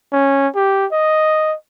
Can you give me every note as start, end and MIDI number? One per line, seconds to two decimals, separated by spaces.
0.12 0.47 61
0.55 0.86 67
0.92 1.55 75